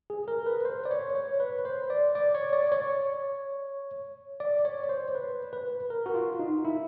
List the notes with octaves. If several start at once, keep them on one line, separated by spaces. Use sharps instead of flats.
G#4
A#4
B4
C5
D5
C#5
C#5
B4
C5
D5
D5
C#5
D5
C#5
D5
C#5
C5
B4
B4
A#4
F#4
F4
D#4
E4